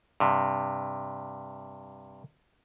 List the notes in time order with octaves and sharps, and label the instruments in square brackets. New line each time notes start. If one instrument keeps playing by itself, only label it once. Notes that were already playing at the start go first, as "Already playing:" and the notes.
[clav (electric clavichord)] G2 C3